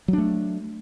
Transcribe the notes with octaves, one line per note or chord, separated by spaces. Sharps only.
F#3 A3 D4